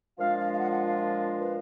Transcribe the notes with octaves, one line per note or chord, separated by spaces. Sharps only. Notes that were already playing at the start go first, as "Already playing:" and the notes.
A#2 F3 G#3 D4 F4 F5
F5
F5
F#5
F#5
F5
B4